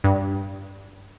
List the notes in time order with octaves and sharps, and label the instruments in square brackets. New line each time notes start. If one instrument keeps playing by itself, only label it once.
[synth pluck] G2